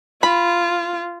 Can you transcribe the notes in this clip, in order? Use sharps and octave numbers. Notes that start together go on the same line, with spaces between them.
F4 B5